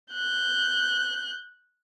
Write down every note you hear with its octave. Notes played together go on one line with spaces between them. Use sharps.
F#6 G6